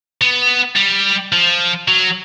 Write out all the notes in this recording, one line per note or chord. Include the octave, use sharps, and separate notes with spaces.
B3
G3
F3
F#3